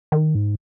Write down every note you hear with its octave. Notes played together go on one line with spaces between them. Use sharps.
D#3
G#2